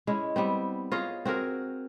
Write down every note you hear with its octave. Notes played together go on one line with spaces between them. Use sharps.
G#3 C#4 E4
G3 B3 C4
F4 G#4 C#5 D#5
C4 F#4 G#4 A#4